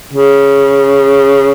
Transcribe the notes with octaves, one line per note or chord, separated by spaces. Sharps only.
C#3